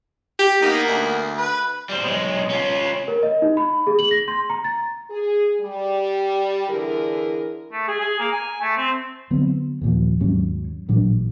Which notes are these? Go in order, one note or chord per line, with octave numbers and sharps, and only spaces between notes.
G4
A#3 B3 D#4
D2
B4
G3 C5
B1 G#3
C#4 F4
A#4
D#5
D#4
B5
G#4
F#7
A#6
C6
A#5
A6
G#4
G3
D3 E3 E4 G#4 A#4
A3
G#4
G#4
A#3
G#5
A3
C4
D3 F#3 B3 C4
D#2 A#2 F3
D#2 G#2 F#3 C#4
A1 A#2 F#3 D4